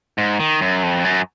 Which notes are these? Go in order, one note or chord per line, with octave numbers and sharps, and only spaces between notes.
G#2
D#3
F#2
F2
F#2